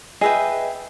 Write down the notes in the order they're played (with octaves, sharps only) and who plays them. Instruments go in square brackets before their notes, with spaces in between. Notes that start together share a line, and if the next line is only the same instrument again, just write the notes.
[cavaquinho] G#4 E5 G5 [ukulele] B4 D#5